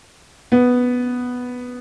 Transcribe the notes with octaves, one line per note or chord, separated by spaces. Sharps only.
B3